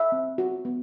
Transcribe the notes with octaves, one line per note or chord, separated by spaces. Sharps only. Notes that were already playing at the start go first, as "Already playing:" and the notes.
Already playing: E5
C4
F#4
B3